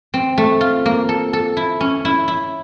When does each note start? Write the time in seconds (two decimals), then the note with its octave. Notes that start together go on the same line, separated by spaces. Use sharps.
0.14 C4
0.38 A3
0.61 F4
0.86 A#3
1.09 A4
1.33 A4
1.57 E4
1.81 C#4
2.05 E4
2.28 E4